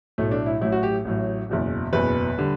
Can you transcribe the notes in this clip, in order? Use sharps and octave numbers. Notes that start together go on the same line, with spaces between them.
B1 A2 F#3 A3
D4
E4
A1 A2 F#3 E4
F#4
G4
A1 A2 F#3
F#1 E2 B2
F#1 E2 B2 B4
D3 G3